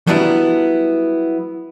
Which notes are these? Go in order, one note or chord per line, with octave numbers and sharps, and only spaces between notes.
F#3 G3 B3 D4 E4